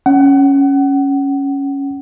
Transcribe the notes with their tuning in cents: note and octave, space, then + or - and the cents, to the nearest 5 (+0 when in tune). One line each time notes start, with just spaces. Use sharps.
C#4 +0 F#5 +30